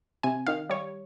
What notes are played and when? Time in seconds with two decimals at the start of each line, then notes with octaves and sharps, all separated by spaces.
0.23 C3 G#5
0.46 D#3 F5
0.70 G3 C#5